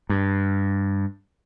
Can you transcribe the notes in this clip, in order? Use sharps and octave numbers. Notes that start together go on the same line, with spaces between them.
G2